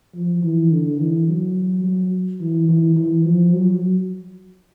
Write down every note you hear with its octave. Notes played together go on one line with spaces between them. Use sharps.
F3
E3
D3
E3
F#3
F#3
E3
E3
E3
F3
F#3